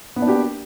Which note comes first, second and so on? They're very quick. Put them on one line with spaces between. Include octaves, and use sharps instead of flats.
B3 A#3 D4 F#4 G4